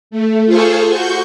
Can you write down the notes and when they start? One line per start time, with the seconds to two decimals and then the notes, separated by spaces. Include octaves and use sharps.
0.11 A3
0.46 F4 G#4 A4 C5 C#6
0.88 F#4 C#6 G6